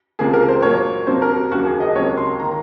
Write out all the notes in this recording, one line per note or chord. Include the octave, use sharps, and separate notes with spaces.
C#2 C3 F3 A#3 G#4
A#4
C5
A#2 F#3 A#3 C#5
F2 C3 F#3 A#3 C5
A#4
F#4
D#2 C#3 F#3 A#3 F#4
G#4
D#5
C#2 C3 F#3 A#3 C#5
C6
D#3 A#3 A#5